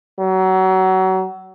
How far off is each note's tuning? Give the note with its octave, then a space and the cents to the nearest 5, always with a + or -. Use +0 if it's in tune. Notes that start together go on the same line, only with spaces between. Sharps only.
F#3 +25